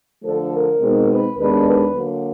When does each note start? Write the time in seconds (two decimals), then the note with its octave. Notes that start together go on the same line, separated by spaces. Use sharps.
0.24 D3 F3 A3 A4
0.52 A#4
0.81 B2 G#3 C4 D#4
1.09 B4
1.37 D#2 D#3 G#3 B3 D4 B4
1.66 B4
1.94 D3 F#3 A#3